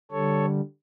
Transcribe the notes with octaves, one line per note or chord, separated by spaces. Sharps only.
D3 G3 A4 C#5